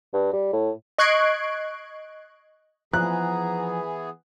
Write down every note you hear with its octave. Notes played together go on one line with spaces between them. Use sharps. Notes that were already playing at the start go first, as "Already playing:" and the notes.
G2
G3
A2
D#5 C#6 F#6 G#6 C7 D7
E3 F3 B3 G#4 A#5 F#6